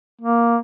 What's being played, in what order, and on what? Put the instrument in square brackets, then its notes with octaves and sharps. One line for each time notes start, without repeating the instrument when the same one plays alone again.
[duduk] A#3